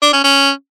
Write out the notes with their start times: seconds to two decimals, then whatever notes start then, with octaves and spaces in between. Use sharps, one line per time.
0.02 D4
0.13 C#4
0.24 C#4